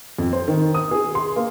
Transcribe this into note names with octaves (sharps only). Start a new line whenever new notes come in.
F2
C5
D#3
D#6
G#4
C6
A#3